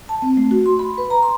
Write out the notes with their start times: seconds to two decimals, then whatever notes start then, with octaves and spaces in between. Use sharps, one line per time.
0.09 A5
0.22 C4
0.37 A3
0.51 F#4
0.66 C6
0.79 B5
0.98 B4
1.10 A#5
1.23 C6